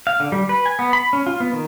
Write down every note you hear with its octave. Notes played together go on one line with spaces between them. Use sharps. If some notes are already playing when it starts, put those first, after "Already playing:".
F5
D3
G3
B4
G#5
B3
B5
C#4
F4
B3
D#3